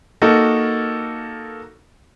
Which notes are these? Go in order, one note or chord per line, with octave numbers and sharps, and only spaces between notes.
A#3 D#4 F#4 A4 A#4